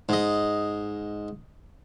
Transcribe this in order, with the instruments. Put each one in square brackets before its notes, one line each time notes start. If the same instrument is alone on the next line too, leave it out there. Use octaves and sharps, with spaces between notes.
[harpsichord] G#2 D#5